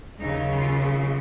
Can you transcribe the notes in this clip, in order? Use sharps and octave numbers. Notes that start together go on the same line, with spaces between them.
D#2 C#3 F#3 D#4
F4